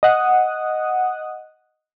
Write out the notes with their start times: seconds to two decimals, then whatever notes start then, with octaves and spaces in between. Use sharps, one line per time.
0.03 D#5 F#5 D#6